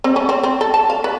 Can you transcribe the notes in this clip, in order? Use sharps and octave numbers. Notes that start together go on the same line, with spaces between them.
C4
C#4
C4
C4
A4
A5
F5
B4